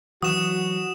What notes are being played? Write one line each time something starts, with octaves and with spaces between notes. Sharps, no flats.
E3 F#3 F#4 D#6 E7